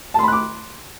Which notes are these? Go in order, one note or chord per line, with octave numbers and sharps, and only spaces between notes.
A5 B5 C6 D6 F#6